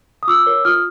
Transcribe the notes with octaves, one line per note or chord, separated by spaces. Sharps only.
D#6
F4 D6 E6
A#4 C#5
F4 D#6 F6